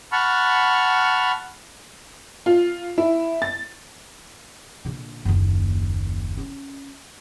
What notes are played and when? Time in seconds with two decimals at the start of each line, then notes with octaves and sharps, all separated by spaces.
0.12 F#5 A5 B5 C#6 F6
2.46 F4
2.98 E4
3.42 A6
4.85 A#2 D3
5.25 F#1 D#2
6.38 C#4